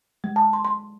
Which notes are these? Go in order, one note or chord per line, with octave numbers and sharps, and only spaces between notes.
G#3
A5
C6
C6